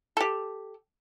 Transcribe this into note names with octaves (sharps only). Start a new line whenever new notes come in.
G4 A4